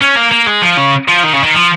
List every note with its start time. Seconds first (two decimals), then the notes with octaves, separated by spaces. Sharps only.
0.02 C#4
0.17 A#3
0.32 A#3
0.47 G#3
0.62 F3
0.77 C#3
1.08 F3
1.24 D#3
1.33 C#3
1.44 D#3
1.54 F3